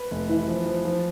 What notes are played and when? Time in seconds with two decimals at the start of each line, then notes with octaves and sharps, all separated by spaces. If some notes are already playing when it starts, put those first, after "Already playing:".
Already playing: B4
0.11 F1
0.29 E3
0.48 F3
0.66 F3
0.85 F3